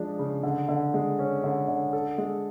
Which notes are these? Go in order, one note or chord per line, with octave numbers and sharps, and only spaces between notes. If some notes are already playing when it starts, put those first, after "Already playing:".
Already playing: F3 G#3 D4
C#3
D3
D3
G#3
C#4
D3
D3
A4
G#3